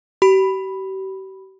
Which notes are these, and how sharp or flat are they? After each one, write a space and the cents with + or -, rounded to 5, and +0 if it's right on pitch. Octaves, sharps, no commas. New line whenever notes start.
G4 -40 B5 +0